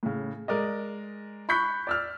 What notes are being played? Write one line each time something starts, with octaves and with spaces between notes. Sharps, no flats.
A2 C#3
G#3 A#4 D5 D#5
B5 C#6 F#6 G6 B6
D5 E6 F6